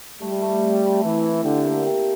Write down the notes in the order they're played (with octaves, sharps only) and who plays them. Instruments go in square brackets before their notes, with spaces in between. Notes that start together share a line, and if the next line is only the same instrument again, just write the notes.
[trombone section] G3 [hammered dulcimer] A3
[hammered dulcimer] A3
C4
A3
[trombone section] E3 [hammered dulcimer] E4
[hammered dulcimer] E4
[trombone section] D3 [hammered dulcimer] G4
[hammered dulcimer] A#3
G4